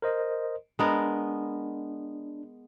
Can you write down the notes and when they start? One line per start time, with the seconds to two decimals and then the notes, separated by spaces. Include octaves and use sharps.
0.02 A#4 C5 D#5
0.79 G#3 B3 D4 A#4